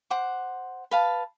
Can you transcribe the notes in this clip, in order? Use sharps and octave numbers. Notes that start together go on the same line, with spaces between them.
C5 F#5 D6
B4 F5 A5